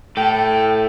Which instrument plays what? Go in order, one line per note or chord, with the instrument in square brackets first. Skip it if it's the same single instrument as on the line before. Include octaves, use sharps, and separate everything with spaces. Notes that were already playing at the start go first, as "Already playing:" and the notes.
[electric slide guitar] A2 [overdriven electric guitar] A4 [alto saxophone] G5